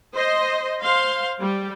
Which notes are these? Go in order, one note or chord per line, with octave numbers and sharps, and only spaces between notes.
C5 D#5
C5 F5 C6
G3